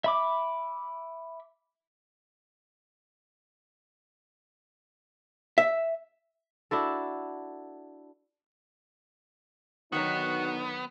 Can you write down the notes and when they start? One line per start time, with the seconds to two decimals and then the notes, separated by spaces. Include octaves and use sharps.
0.04 E5 B5 D6
5.58 E5
6.71 D4 E4 F#4 A4
9.92 B2 D3 D#3 F#3 B3 D#4 F#4